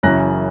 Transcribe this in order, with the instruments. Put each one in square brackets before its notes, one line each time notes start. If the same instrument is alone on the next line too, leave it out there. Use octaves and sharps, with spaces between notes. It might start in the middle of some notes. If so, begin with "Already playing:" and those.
[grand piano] F#1 F#2 C#3 E3 F#6 A#6